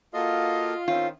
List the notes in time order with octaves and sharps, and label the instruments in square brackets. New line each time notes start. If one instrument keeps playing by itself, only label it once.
[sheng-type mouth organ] A#3 F#4 A4 [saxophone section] F4 [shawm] D#5
[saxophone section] D#3 C4 [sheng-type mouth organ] C#4 [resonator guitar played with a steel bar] F4